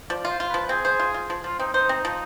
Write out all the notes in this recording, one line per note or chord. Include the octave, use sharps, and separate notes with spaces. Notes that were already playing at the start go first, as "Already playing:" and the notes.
F3 D5
F4
C5
F4
F3 B4
C4 G#4
C5
F4
F4
F3
F3 F4
C4 D#4
D#4 C5
C4
F3